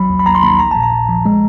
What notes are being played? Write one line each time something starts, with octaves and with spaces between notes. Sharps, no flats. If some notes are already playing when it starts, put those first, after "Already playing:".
Already playing: A1 F#3 B5
D#2
B5
D#2 A#5
C6
D#2 B5
A#1 A#5
A#2 A5
A#5
A#1
F3
G#3